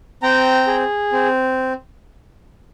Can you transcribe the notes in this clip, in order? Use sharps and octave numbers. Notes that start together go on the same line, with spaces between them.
C4 G5 A#5
G#4
C4